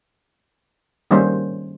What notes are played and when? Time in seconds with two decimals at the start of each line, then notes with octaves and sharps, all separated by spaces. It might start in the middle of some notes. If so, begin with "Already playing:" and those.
1.11 D#3 G3 A#3 C#4 C5